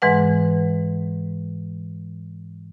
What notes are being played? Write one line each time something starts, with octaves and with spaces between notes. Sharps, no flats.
G#2 E3 G#3 B4 F#5